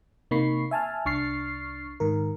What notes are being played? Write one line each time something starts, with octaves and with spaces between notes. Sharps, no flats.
C3 A#3 D#4 B5 C#6 C7
E5 G#5 A5 F6
C2 D4 C#6 F6 A6 C7
G#2 D#3 A#4